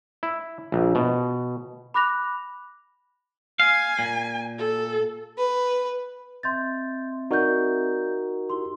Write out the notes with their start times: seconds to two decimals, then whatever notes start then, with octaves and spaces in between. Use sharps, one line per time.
0.23 E4
0.72 A#1
0.95 B2
1.94 B5 D6 F#6 A#6 F7
3.60 F5 G#5
3.99 A#2
4.58 A4
5.38 B4
6.43 C4 D#5 E5 C6 G6 A6
7.31 D#4 F#4 A#4 D5 G6
8.50 E4 G4 C6